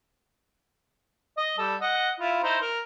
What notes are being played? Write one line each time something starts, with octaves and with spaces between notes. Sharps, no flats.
D#5
G3 A4
D#5 F#5
E4 F4
D#4 E4 C5
A#4